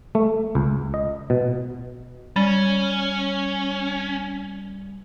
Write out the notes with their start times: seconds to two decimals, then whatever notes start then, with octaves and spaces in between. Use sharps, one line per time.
0.15 A3
0.55 C#2
0.94 D#5
1.30 B2
2.36 G3 C#4